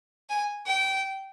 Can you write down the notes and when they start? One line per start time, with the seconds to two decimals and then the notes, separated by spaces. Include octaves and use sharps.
0.30 G#5
0.66 G5